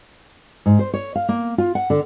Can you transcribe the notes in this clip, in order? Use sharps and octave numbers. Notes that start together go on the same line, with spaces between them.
G#2
C5
C#5
F5
A#3
F4
F#5
D3